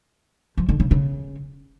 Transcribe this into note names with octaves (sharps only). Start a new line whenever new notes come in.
F3
D3
C#3
C#3